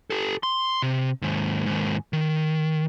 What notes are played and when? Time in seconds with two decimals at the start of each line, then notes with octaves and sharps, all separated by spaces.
0.10 G4 A4
0.43 C6
0.82 C3
1.22 D#2 G#2
1.66 D#2 G#2
2.13 D#3